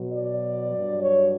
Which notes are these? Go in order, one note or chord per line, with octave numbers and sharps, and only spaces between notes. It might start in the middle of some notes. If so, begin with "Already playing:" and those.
Already playing: B2 F#3
D5
G2 F#3
C#5